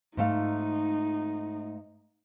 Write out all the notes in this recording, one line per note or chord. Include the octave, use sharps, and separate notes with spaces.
G#2 A3 D#4 F5